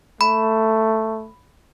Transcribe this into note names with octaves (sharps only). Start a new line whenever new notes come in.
A3 B5